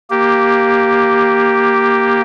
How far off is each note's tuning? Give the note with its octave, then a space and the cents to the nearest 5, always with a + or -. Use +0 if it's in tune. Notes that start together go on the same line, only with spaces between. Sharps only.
A#3 +0 G4 +0